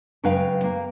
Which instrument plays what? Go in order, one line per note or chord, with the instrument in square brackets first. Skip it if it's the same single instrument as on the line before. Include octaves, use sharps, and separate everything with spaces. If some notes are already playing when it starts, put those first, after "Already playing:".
[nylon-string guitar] F#2 C#3 G#3 B4 F5 G5
A#3